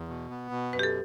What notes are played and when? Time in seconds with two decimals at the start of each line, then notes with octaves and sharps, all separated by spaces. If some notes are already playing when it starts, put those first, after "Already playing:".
Already playing: E2
0.08 B2
0.31 B3
0.51 B2
0.73 F#2 B4
0.79 G4
0.83 A4